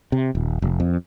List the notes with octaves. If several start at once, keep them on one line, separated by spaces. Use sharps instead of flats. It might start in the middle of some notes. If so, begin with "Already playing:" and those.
C3
D#1
F1
F2